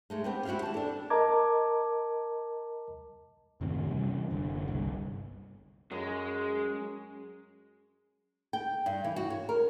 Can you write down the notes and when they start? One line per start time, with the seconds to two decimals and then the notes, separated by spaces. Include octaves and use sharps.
0.10 G#2 G#3 A3
0.24 B3 C4 G4
0.45 E4 F#4 G4 E5 F5
0.62 E3 A5
0.74 D4 A4
1.10 A#4 D#5 A5 A#5 D6 G#6
3.61 F#2 A2 C3 D#3
3.89 C3 E3 G3 C#4
4.31 F#1 D3
4.67 G1 C2 G2
5.92 F#2 G#3
8.53 G5
8.86 G2
9.04 E3
9.16 F#4
9.30 C#5
9.49 A#4